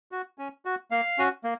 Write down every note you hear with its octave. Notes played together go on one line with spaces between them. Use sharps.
F#4
C#4
F#4
A#3 F5
C#4 F#4
A#3